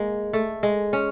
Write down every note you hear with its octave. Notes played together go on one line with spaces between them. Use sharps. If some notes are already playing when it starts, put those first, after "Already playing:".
Already playing: G#3 A#3
A3
G#3
C#4